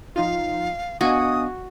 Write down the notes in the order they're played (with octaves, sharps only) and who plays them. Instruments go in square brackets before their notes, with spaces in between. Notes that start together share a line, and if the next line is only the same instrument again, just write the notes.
[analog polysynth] F3 D#4 F4 [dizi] F5
[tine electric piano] B3 D4 F5 [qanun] F#4 [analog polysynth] D#5 G#5 [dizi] D#6